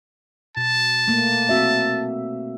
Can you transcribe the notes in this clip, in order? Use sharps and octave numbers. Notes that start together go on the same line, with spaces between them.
B2 A5
A3 A#3
C4 F#4 E5